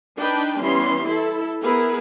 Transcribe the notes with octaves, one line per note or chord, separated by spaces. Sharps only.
D4 D#4 B4 G5
E3 G3 B3 C#4 C6
E4 A4
B3 E4 G#4 A#4 B4